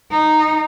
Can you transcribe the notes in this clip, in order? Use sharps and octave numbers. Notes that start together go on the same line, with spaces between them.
D#4